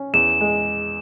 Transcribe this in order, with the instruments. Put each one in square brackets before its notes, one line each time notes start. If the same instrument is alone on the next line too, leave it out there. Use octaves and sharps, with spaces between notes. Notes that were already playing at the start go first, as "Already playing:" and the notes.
Already playing: [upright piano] C#4
[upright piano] E2 [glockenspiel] E7
[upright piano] G#3